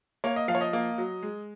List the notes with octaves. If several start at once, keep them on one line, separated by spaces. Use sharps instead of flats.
A#3 C#5
D#5
F3 F5
C#5
D#5
A#3
F#3
G#3